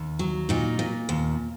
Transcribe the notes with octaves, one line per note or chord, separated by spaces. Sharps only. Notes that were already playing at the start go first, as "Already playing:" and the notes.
Already playing: D#2
F#3
A#2 D#4
A#2
D#2